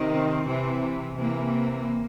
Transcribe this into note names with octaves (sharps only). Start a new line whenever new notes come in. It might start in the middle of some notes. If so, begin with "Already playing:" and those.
Already playing: C3 D#3
C4
C3 E3
C3 E3 A#3